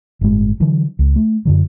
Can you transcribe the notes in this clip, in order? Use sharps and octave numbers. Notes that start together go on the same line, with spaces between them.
G1 A2 G#3
D3 E3 F#3
C#2
A3
F#2 D3 F#3